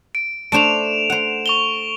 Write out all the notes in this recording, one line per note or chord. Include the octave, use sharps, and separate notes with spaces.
D7
A3 D4 C5 D7 E7 F7
C5 F#5
C#6 F7 G7